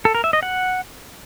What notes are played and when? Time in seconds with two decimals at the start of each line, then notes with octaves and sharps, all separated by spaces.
0.05 A4
0.15 A#4
0.24 E5
0.33 D#5
0.43 F#5